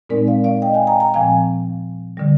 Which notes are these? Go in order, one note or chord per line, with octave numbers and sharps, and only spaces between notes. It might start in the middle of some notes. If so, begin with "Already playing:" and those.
A#2 G#3 C4 D#4 A#4 D5
D5 F5
D5 F5
D#5 G5
F5 G#5
G5 A#5
G5 A#5
A#2 F3 C4 F5 G#5
D3 G3